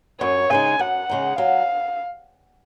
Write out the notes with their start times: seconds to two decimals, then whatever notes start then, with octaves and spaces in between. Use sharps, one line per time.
0.21 F#2 C#5
0.50 C#3 G#3 D#4 G#5
0.79 F#2 F#5
1.09 C#3 G#3 D#4
1.38 F#3 F5